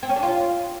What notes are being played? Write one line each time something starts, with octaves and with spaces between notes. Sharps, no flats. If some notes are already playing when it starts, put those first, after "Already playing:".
C4
C#4
D4
F4